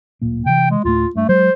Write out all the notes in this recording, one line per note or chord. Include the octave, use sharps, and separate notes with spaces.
D1 A#2 A#3
C3 E3 G5
G#3
D2 A2 A3 F4
G2 A3
F#3 G#3 C5